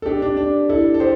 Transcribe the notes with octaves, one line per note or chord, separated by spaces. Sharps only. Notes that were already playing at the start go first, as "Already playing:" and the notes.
A4
D4 G4
D4
D4
E4 A4
A4
G4 C5